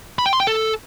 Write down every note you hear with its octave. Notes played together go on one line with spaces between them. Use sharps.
B5
G5
C6
G5
A4